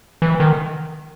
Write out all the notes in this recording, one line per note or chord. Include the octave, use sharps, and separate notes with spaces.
E3
D#3